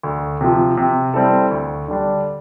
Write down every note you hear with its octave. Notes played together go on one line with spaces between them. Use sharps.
D2
C3 F3
C3
G3 C4 E4 A4
D2
D3 G3 D4